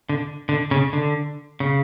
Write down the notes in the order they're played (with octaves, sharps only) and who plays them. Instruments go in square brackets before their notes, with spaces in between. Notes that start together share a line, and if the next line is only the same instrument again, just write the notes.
[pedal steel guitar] D3
D3
C#3
D3
C#3